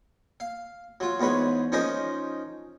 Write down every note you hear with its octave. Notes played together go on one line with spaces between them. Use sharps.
F5
F#3 F4
E2 G#2 B4 C#5 C6
F3 C#4 D#4 A#4 C5 D#5